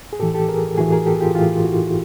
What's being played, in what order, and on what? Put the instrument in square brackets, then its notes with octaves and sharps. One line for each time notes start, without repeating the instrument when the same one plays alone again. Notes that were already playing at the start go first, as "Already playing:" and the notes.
[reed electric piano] G#4
A2 E3 G4 A4
G4 A4
G#4 A#4
A2 E3 F#4 G#4
G#4 A#4
G4 A4
G#4
F4 G4
A2 E3 F4 G4
E4 F#4